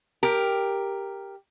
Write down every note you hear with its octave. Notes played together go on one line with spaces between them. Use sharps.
G4 A#4